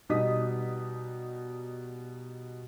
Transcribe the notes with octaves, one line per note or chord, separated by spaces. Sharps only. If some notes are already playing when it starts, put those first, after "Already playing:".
B2 G3 D#4 D#5 D#6 B6